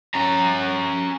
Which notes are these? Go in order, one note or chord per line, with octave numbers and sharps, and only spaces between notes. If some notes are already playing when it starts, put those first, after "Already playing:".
C#4 A#5